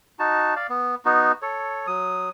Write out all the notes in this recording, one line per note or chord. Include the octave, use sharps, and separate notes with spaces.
D#4 F#4 A5
D5 F5
B3
B3 D#4 F#4
A4 C#5
F#3 D#6